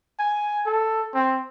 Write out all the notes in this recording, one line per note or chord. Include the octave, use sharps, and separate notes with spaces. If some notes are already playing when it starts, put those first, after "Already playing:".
G#5
A4
C4